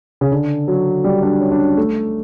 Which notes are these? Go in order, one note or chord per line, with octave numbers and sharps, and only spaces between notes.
C#3
D3
F#3
G3
D4
C#4
D4
C#4
A3